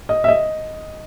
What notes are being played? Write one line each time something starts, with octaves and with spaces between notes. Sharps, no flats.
D#5
E5
D#5